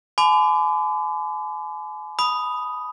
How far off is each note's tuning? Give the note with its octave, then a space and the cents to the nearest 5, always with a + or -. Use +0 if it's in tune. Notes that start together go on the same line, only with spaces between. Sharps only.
G#5 +40 B5 +45 D6 +0
B5 +0 D#6 +0